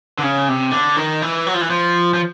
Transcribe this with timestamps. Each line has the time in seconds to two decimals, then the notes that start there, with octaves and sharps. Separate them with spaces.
0.18 D3
0.23 C#3
0.48 C3
0.72 D3
0.96 D#3
1.22 E3
1.47 F#3
1.54 F3
1.61 E3
1.70 F3
2.14 F3